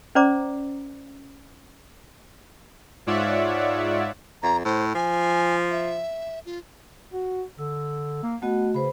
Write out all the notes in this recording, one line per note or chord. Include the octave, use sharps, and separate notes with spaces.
C#4 C5 D5 A#5 D6
G#2 F4 C#5 D5 E5 F#5
F2 A#5
A2 C5
F3 G#5
E5
F4
F#4
D3 E6
A#3
A3 B3 F#4 D#5
C#3 B4 C5 B5